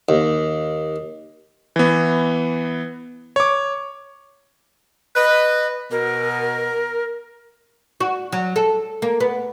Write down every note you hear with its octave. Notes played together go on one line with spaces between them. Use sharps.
D#2
E3 B3
C#5 D6
B4 D#5
B2 A#4
F#4
F#3
A4
A#3
B3